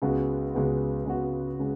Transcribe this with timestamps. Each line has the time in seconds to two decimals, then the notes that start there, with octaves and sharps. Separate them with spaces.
0.02 C#2 C#3 G#3 B3 F#4
0.54 C#2 C#3 G#3 B3 F#4
1.05 C#2 C#3 G#3 B3 F#4
1.59 C#3 G#3